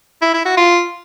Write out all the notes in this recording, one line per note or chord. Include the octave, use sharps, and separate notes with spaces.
E4
E4
F#4
F4